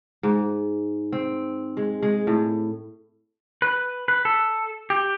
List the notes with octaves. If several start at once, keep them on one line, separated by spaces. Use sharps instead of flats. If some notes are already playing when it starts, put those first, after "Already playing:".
G#2
C4
G#3
G#3
A2
B4
B4
A4
G4